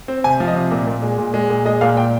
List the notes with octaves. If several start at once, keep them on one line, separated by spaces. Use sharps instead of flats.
C4
C3 G#5
F3
D#5
C3
A#2
A#2
G#3
A#2
G#3
A#2
G#3 D#5
A#2 F5
A#2 G5